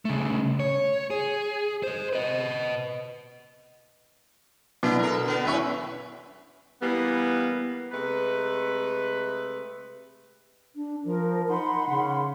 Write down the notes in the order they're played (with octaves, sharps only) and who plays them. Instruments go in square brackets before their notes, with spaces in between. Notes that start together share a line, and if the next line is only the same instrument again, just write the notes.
[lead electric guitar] C#3 A3
C#5
G#4
C5 D#5
B4 D#5
[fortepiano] B2 [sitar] A#3 D4 E4
[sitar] A4 A#4
D3 B3
[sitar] F#2 C#4 E4 [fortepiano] B4 E5 C#6
[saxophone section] E3 G3 A#3 B3
C3 G#3 A3 B4
[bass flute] D4
[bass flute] F3 [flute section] A#4
[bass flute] D#4 [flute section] F#5 B5 C6
[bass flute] C#3